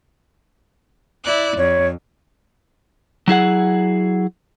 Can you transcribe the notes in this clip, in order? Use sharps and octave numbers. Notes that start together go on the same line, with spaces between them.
E4 D5 F#6
F2 C#5
F#3 E4 G#4 F#5